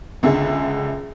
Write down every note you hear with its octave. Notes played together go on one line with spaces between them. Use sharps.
C#2 D3 G#4 E5